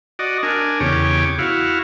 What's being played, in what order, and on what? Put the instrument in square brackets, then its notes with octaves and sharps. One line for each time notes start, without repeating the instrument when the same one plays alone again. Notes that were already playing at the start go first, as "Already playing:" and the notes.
[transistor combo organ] F#4 D5 D#5
D4 A#4 G#5
E2 C#3 G4 C#5 D6
E4 F#4 F5